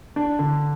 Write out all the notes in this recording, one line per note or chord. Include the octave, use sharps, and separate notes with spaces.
D4
D3